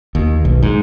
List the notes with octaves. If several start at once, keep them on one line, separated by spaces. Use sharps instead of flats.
D#2
B1
G#2